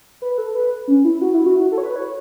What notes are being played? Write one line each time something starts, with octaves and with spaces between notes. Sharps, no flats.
B4
A4
B4
C#4
E4
F#4
E4
F#4
A4
C#5
B4
C#5